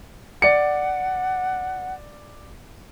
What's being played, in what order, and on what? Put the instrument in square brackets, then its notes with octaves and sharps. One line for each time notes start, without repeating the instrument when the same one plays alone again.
[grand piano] D5 C#7 [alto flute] F#5